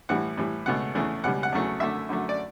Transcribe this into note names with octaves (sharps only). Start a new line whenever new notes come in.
A2 E3 G3 F#5
A2 E3 G3
C#2 B2 A3 F#5
E2 C#3 E3 A3
C#2 B2 G3 F#5
F#5
E2 C#3 F#3 A3
F#2 D3 A3 E5
F#2 D3 F#3 A3
D5